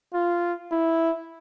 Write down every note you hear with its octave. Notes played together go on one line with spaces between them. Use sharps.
F4
E4